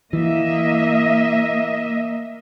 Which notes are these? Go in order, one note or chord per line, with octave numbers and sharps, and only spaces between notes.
E3 A#3 D#5 E5